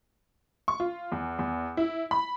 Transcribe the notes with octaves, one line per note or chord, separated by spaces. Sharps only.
C#6
F4
E2
E2
E4
B5